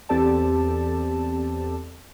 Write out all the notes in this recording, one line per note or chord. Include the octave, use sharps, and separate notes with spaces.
E2 C4 G4 A4 D5 A5